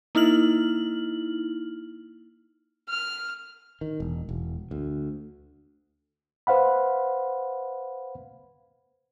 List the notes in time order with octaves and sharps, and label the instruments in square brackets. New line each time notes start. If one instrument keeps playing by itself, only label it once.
[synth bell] A#3 D#4 E4 F6 F#7
[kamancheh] F6
[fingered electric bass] D#3
E1
E1
D2
[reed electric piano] B4 C5 F5 F#5 B5